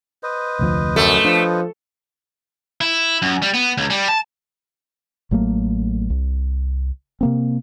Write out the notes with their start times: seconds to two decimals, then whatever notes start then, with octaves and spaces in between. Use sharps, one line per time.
0.23 B4 C5 D#5
0.59 F1 D2 F3
0.96 F#2 A3
1.25 F3 D4
2.81 E4
3.22 F#2
3.42 G3
3.54 B3
3.77 C#2
3.90 G3
4.09 A5
5.31 A1 F#3 A3 A#3
6.10 C2
7.21 C3 A#3 C4